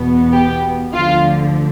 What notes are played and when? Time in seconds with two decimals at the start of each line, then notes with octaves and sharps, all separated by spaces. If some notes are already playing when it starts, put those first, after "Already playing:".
Already playing: E2 B2 B3
0.33 G4
0.95 D2 D3 F3 F4